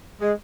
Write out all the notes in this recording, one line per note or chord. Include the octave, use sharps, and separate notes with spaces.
G#3